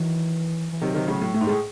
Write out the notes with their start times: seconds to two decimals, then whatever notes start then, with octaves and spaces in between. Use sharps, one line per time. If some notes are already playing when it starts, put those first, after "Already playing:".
Already playing: D#3 E3 F#3
0.72 E3
0.82 C3 D#3 F#3
0.95 C3 D#3
1.07 A2 C#3
1.21 A2
1.34 A2 A3
1.41 G#2
1.47 A2 G#4